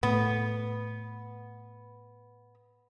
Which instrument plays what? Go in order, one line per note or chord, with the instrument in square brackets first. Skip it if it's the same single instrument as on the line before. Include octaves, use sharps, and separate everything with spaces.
[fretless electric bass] A2 [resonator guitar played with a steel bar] B3